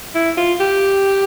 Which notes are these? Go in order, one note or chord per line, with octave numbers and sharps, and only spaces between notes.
E4
F4
G4